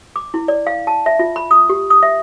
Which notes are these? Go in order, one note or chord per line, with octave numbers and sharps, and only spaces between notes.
D6
E4
D5
F5
A5
E5
F4
B5
D#6
G4
D#6
E5